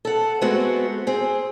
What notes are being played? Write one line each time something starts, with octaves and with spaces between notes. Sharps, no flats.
A4 F#5
G#3 A3 B3 C4 F#4
C4 G#4